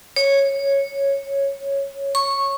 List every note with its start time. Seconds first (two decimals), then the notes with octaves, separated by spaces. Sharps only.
0.16 C#5
2.15 C#6